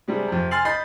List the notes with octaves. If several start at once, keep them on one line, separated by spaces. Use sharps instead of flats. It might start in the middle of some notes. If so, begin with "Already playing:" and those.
C3 G3 G#3
F2 C3
G#5 C6 F6 A6 C7 F#7
D#5 B5 G6 A6 C7